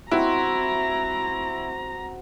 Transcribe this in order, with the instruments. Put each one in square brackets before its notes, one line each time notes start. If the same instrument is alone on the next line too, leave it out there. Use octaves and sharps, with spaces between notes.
[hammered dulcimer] C4 F#4 [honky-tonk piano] E4 [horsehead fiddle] A#5